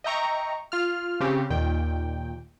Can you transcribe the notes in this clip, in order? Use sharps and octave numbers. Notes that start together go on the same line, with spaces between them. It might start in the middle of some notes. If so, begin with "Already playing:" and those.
D#5 E5 G5 A#5 C#6
F4 F6
C#3 C4 C#4 G4
D#2 A#2 D#3 G5